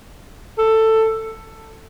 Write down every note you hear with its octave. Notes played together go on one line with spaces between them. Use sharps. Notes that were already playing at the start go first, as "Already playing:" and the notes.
A4